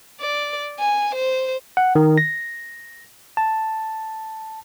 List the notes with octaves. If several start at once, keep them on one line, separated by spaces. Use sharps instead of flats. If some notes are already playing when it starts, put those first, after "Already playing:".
D5
G#5
C5
F#5
D#3
A#6
A5